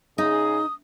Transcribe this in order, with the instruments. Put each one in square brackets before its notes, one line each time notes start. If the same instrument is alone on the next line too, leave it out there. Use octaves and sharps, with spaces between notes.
[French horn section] C#3 G#4 [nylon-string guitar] D#4 [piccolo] D#6